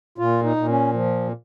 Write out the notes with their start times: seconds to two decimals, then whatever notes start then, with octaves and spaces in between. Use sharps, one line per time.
0.18 A#2 F4
0.44 D#4
0.56 A#2
0.68 C#4
0.93 F3